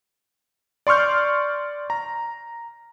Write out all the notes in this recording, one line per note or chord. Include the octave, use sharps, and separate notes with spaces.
D5 C6 C#6 F6 G6
A#5